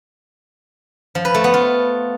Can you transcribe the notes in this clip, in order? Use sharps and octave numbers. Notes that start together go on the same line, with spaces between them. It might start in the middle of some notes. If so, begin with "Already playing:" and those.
F3
B4
A3
B3
F4